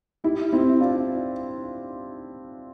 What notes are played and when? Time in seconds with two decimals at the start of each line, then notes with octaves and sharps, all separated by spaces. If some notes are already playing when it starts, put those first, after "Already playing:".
0.24 E4 G4
0.53 C4 E4
0.80 D4 F4